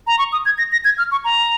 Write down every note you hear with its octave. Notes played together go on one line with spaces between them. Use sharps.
A#5
C#6
D#6
G#6
A#6
A#6
G#6
F6
C#6
A#5